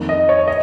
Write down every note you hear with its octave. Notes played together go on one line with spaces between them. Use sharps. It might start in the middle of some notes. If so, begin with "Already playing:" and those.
Already playing: F2 D#3 A#3
D#5
C#5
D#5